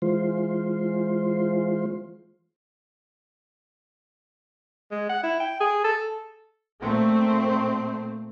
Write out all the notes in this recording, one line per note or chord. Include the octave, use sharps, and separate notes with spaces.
E3 G#3 F4 C5
G#3
F#5
E4
G5
G#4
A4
A#2 A3 C4